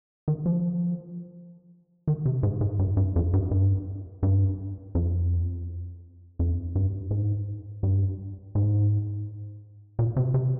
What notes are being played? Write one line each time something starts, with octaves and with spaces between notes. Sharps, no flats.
D#3
F3
D#3
C3
G#2
G#2
G2
G2
F2
G2
G2
G2
F2
F2
G2
G#2
G2
G#2
A#2
C3
C3